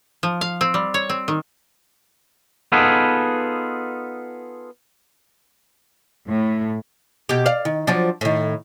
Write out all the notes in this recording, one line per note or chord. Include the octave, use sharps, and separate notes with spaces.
F3
F5
C4
G3
C#5
C4
D#3
B3 D#4 F4 G#4 A4 B4
A2
B2 G4
D5 F5
D#3
F3 F#3 D4
A2 D#3